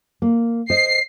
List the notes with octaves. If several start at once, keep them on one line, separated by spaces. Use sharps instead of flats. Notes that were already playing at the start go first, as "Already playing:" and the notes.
A#3
C5 D#5 C7